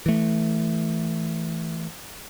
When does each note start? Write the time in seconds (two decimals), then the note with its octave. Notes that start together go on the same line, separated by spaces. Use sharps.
0.06 E3 A3